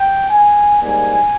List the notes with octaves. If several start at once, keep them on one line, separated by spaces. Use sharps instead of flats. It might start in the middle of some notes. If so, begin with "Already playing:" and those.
Already playing: G5
G#5
G#2 G3 A#3 G#5